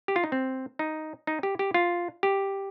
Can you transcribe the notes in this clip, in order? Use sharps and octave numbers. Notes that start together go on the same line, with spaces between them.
G4
F4
D#4
C4
D#4
D#4
G4
G4
F4
G4